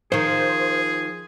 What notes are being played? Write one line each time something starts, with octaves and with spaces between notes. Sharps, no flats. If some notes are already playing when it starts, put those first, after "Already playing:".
D#3 F3 G#4 C5